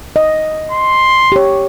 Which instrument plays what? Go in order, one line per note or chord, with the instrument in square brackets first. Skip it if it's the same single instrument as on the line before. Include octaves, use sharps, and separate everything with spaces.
[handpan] D#5
[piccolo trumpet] C6
[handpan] G4 C#5